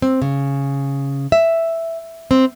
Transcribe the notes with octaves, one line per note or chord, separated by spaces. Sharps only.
C4
C#3
E5
C4